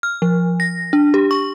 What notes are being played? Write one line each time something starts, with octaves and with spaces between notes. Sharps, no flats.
F6
F3
A#6
D4
G4
C#6